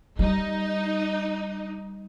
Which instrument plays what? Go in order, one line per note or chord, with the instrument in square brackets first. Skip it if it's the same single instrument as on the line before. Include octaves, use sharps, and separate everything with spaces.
[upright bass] G3 [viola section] D#4